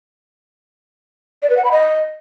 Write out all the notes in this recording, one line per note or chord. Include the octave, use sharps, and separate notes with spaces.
D5
B4
F#5
B5
D#5